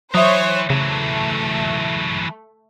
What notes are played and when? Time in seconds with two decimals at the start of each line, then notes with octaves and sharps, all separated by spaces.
0.14 E3 F#3 C5 C#5 E5 D#6
0.70 C#3 E3 F#3 A3